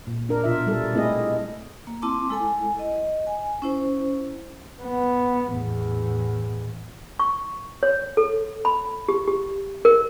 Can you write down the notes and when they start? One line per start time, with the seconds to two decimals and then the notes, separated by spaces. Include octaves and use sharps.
0.07 A#2
0.29 D4 A#4
0.44 B2 F4 E5
0.67 G3 A4
0.93 G#3 A3 C4 E4 G#4 D#5
1.87 A#3
2.02 C4 E4 A5 C6 D6
2.29 G#3 E4 A4 G#5
2.79 D#5
3.27 G#5
3.62 C#4 E4 C5
4.83 B3
5.52 E2 A2
7.19 C#6
7.83 C#5
8.17 A4
8.65 B5
9.09 G4
9.28 G4
9.85 A#4